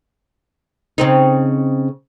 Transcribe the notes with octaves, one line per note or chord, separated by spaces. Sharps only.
C#3 C4 D#4